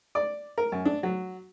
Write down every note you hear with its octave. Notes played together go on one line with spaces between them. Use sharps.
D5
A#4
F#2
D4
F#3